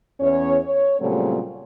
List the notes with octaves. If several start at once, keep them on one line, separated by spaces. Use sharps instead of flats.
E2 C#4 C#5
C#5
A#2 C#3 F#3 G3 A3 C4